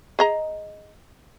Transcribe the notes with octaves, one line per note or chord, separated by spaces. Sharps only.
G#4 D#5 A#5